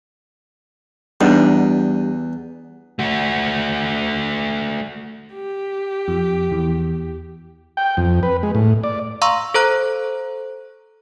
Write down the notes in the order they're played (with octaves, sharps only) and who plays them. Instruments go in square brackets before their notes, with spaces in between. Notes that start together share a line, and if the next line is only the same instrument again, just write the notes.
[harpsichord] E2 [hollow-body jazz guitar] G3 D4 D#4
[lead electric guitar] A3 F#4
[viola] G4
[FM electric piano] F2
E2
[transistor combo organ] G5
F2
B4
G#3
A2
D5
[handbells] F5 A#5 C6 C#6 E6
A4 C5 A#5 F#6